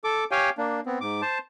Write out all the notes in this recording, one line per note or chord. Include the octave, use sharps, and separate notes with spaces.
A4 D6
G4 C#5 F5 G5 G#5
A#3 D4
B3 C4
G#2 D6
C5 A5